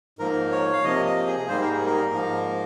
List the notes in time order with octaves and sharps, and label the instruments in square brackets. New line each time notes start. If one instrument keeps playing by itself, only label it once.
[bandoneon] G#2 F3 A#3 A#4
C#5
F5
C3 F3 A#3 D#5
D#5
G#4
G#2 G3 A#3 C5
A#4
G#4
A#4
G#2 F3 A#3